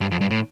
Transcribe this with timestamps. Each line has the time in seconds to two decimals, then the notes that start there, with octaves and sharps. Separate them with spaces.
0.01 G2
0.11 F2
0.21 G2
0.31 A2